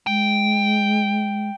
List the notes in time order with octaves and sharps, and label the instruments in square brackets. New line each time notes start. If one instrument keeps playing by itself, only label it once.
[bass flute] G#3 [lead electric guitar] G5